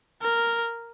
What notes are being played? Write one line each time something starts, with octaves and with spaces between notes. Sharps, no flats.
A#4